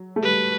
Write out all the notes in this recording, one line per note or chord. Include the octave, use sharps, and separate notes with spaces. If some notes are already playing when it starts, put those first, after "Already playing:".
Already playing: F#3
A3
G3 B4